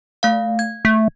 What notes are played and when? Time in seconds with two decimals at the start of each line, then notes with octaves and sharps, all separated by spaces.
0.23 A3 F5
0.59 G#6
0.85 A3